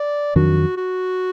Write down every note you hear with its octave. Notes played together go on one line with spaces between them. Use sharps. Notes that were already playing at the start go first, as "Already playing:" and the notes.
Already playing: D5
F2 D#3 F#3 D4 F#4
F#4